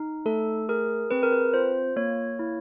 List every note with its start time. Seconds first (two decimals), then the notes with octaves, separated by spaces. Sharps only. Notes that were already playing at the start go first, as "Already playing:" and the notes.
Already playing: D#4
0.25 A3 A4
0.69 G#4 A#4
1.11 C4 B4
1.23 A#4
1.33 B4
1.53 F4 C5
1.96 A#3 C#5
2.39 E4